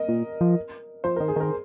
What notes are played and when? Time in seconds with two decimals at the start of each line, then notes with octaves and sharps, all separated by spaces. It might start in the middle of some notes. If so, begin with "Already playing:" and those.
Already playing: A#4 D#5
0.08 A#2
0.41 F3
1.04 F3 C5
1.16 A#4
1.20 D#3
1.28 G#4
1.36 D#3 A#4